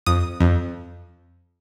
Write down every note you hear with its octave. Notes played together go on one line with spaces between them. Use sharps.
F2 D#6
F2